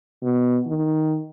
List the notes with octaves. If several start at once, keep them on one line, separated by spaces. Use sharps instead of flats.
B2
D#3